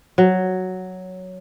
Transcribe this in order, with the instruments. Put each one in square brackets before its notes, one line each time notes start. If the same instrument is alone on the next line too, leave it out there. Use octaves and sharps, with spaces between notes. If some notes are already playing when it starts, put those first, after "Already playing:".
[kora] F#3